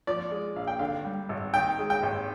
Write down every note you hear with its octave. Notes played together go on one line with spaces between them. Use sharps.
F3 D5
G#3
A#1 F5
G5
D3 F5
G3
G#1
D#3 G5
G#3
G5
G#1